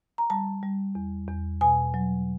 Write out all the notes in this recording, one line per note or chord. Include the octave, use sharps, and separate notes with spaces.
A#5
G3 A5
G3
E2
E2
B2 G#5
F#3